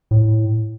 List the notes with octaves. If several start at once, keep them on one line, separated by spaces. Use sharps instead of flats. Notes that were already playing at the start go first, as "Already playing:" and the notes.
A2